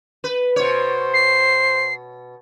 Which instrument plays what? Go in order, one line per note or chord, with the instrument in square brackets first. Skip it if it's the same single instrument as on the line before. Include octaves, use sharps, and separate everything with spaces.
[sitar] B4
[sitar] B2 C#5 [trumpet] C5
[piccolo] C7